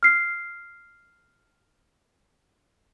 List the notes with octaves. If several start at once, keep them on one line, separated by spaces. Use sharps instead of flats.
F6 C7